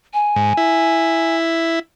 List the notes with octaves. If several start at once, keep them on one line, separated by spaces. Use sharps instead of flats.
G#5
G#2
E4